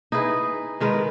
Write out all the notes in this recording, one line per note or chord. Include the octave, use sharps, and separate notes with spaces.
D#4 E4 G#4 B4
D#3 G#3 A#4 B4